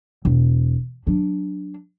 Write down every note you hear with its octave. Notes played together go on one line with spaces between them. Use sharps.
E1
F#3 D4